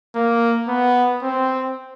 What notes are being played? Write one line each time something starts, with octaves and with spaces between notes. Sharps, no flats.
A#3
B3
C4